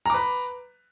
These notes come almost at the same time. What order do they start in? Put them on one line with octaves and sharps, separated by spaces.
A#5 D6 B4